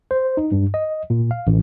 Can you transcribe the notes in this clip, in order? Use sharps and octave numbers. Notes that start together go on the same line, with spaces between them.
C5
D#4
G2
D#5
A#2
F5
A1